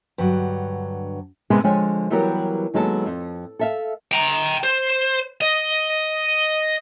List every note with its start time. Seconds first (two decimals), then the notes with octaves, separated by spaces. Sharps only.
0.18 G2 D3 F#3
1.50 C3 G#3 B3 G#4 B4
1.64 D3 F3 G#3 C#5 G5 G#5
2.10 E3 F#3 G3 B3 G4 A#4
2.74 D#2 F#3 G#3 B3 A4
3.06 F2
3.59 A4 E5 F5
4.12 G5 A#5
4.63 C5
5.41 D#5